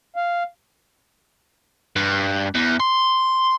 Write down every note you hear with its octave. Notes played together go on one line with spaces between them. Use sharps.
F5
G2
E2
C6